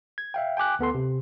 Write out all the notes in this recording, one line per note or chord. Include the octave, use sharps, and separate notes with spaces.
G#6
E5 F5 G5
G5 G#5 D6 F#6
D2 B3 A4 C6
C3